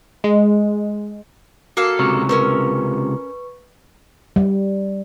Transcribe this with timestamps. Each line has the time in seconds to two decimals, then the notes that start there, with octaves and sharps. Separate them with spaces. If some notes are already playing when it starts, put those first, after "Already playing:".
0.24 G#3
1.77 A#3 F#4 A4 F5
1.99 C#2 C3 A#5 C#6 E6
2.29 C#4 A#4 B4 C#6 E6
4.36 G3